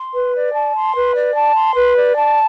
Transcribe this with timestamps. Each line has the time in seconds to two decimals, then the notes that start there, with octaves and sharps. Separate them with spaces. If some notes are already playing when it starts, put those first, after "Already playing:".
Already playing: C6
0.13 B4
0.34 D5
0.53 A5
0.74 C6
0.95 B4
1.15 D5
1.35 A5
1.55 C6
1.76 B4
1.96 D5
2.16 A5